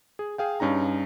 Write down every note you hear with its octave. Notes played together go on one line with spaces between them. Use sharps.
G#4
G#4 F5 G5
G2 C#4 D#4 A#5